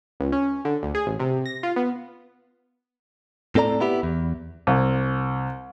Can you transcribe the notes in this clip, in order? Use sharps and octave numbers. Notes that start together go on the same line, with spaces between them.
C#2
C#4
D3
D2
G#4
A1
C3
A#6
F4
B3
A2 C4 A4 D5 A#5
B3 E4 G4
E2
C2